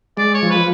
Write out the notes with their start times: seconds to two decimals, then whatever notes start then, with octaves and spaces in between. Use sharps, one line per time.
0.17 G#3 D5
0.34 C#5
0.43 F3
0.51 B4